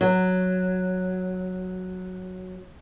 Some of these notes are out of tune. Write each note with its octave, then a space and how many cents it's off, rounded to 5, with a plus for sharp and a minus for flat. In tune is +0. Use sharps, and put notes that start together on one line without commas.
F#3 -5 C#5 +0